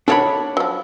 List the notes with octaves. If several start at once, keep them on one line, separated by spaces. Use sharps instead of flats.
D#3 D4 F#4 A4 C#5 B5
F3 F#3